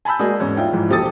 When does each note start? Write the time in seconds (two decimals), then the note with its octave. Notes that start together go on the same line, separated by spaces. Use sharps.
0.05 G#5 A5 B5 E6 G6
0.19 G#3 A#3 F#4 G#4 D5 D#5
0.40 E2 G#2 C#4
0.57 D4 D#4 F4 E5 G5
0.72 G#2 E3 F3
0.89 D#1 A#1 G4 A4 D#6 A6